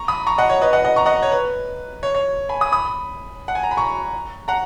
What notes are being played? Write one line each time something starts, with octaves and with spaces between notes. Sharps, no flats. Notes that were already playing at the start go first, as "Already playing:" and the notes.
Already playing: A#5 C#6
B5 D#6
A#5 C#6
D#5 F#5
C#5
B4 D#5
D#5 F#5
D#5 F#5
A#5 C#6
D#5 F#5
C#5
B4
C#5
C#5
G#5 B5
B5 D#6
B5 D#6
F#5
G#5
A#5
B5
A#5 C#6
F#5 A#5